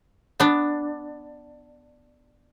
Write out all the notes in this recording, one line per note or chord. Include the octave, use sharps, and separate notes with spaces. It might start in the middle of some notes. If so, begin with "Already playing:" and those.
B3 D4